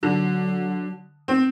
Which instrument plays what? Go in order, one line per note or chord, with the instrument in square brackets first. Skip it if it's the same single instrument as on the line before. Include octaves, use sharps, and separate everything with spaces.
[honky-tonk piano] D3 [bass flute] F#3
[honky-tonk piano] C4